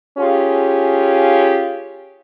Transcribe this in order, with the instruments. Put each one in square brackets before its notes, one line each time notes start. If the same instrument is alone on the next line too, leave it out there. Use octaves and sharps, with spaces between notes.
[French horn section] C#4 F4 G4 G#4